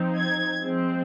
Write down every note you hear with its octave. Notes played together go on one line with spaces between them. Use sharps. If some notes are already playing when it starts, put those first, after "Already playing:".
Already playing: F3 C4 D#4
G#6
F3 G#3 C4